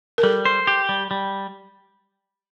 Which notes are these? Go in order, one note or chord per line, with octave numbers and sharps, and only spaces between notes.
A#4
G3 A4
C5
G4
G3
G3